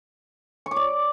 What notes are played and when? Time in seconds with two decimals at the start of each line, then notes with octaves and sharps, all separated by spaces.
0.66 C#6
0.71 D6
0.76 D5